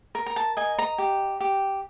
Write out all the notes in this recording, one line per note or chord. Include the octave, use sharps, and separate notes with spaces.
A#4
A#5
A5
D#5 G#5
A#5
G4
G4